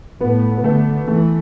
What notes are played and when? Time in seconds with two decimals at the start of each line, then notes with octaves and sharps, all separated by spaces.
0.21 A2 B3
0.58 B3
0.64 D3 A3
1.07 E3 A3